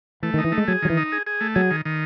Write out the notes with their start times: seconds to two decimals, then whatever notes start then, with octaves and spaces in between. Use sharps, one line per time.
0.23 E3 A3
0.34 D#3 D#4
0.44 E3
0.52 A3
0.58 G#3
0.68 F#3 G#4
0.82 D#3 F#3
0.90 E3
0.97 D#4
1.12 G#4
1.27 G#4
1.41 A3
1.55 F#3 G#4
1.71 D#3
1.85 D#3